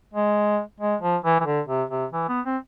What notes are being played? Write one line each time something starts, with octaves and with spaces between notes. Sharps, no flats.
G#3
G#3
F3
E3
E3
D3
C3
C3
E3
B3
C4